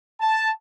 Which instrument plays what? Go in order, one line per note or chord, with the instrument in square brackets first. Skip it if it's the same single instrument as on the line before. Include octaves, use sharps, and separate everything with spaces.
[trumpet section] A5